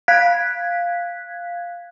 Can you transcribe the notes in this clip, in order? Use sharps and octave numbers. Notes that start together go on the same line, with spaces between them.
F5 F#6 G#6 B6